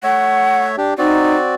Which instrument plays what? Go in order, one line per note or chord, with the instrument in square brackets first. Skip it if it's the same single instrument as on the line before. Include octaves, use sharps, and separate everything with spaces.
[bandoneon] A3 C#5 E5 [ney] F#5
[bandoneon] D4 G4
[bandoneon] C4 F#4 D5 [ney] D#4